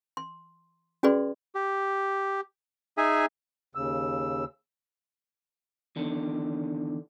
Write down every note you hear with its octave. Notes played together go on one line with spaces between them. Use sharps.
C6
C#4 F#4 G#4 B4 D5 C6
G4
D#4 G#4 E5 G#5
D#2 C#3 E6
E2 D3 D#3